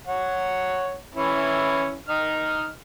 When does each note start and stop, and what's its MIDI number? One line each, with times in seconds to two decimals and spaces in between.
0.07 0.96 73
0.07 0.96 78
1.15 1.97 52
1.15 1.97 61
1.15 1.97 64
2.09 2.68 63
2.09 2.68 75
2.09 2.68 89